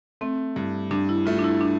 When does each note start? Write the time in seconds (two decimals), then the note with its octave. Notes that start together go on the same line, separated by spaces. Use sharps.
0.21 A3 C4
0.56 G2 E4
0.91 G2 D4
1.09 E4
1.26 A3 F4
1.39 D4
1.44 E4
1.61 D4